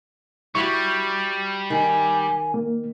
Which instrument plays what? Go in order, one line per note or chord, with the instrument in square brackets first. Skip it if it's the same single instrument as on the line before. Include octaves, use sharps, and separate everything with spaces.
[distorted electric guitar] G3 [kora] E4 F#4 [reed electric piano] C#6
[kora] D#3 [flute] G#5
[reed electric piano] A#3